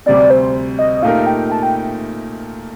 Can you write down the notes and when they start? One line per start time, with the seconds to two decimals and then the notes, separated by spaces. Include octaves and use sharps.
0.06 D2 C3 G3 C4 D5
0.30 C5
0.79 D#5
1.02 A#2 A3 D#4 G4 A#4 F5
1.27 G5
1.52 A5
1.63 G5